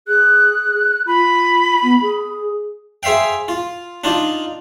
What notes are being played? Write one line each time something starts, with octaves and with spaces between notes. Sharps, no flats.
G#4 F#6
F4 B5
B3
G#4
G#4 C5 E5 F5 G5
F4
D4 D#4 F4